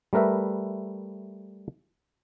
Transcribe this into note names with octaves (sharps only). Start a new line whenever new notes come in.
G3 A3 A#4 B4 E5